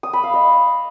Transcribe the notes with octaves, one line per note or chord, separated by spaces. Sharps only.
D#6
B5
F5
D#5